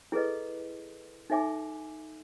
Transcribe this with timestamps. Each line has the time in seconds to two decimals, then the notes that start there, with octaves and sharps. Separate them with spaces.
0.12 E4 G#4 A4 B4 D#5
1.30 D#4 A4 E5 G#5 D6